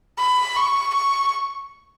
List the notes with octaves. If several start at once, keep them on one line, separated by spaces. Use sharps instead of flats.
B5
C#6
C#6